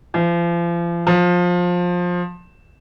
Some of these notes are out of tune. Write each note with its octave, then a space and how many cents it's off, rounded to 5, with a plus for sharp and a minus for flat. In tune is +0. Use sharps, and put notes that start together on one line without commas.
F3 -35
F3 +20